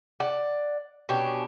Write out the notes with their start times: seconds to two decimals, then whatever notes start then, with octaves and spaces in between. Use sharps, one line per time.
0.20 D5 F#5
1.09 B2 C#4 D4 G4